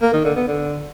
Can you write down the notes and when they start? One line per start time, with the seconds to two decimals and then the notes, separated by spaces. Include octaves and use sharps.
0.02 A#3
0.13 D#3
0.25 D3
0.36 B3
0.48 D3